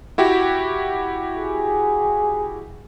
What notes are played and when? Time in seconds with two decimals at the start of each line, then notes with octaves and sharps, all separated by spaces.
0.18 E4 F#4 G4
1.37 G#4